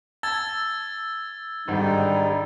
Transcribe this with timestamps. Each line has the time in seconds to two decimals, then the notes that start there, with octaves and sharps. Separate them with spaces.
0.23 A5 E6 G#6 A6
1.68 G#1 G#2 D3 G3 D#4